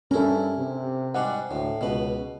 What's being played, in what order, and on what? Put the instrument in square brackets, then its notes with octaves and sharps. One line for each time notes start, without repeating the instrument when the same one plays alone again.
[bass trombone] G2 [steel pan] C#4 A4 [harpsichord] E4 A#4
[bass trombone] C3
[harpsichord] G#2 G3 D4 [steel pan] F#5
[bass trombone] D2 [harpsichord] A2
[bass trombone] C#2 [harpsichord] B2 B4